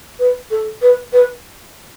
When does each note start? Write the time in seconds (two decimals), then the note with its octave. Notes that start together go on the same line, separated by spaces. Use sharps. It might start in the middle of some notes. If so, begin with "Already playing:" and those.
0.19 B4
0.51 A4
0.82 B4
1.13 B4